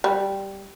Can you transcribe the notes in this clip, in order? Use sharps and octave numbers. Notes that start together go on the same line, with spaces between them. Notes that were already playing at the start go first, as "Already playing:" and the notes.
G3